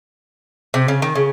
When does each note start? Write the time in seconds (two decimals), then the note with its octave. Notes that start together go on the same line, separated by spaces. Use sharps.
0.74 C3
0.88 C#3
1.02 D#3
1.15 C#3